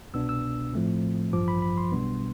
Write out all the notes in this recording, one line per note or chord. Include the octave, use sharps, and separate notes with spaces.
C2 B2 B3 D4 E6
E6
A2 F3 A3 C4
A1 G2 F3 D6
B5
B5
C6
B1 B2 G3 B3 D4